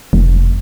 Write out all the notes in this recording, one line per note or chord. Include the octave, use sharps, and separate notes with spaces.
F1